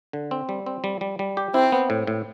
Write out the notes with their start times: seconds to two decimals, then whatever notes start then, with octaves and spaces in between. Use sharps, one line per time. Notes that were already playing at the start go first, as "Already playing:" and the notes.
0.13 D3
0.31 C4
0.49 G3
0.66 C4
0.84 G3
1.01 G3
1.19 G3
1.37 G4
1.54 C4 E4
1.72 B3
1.90 A2
2.07 A2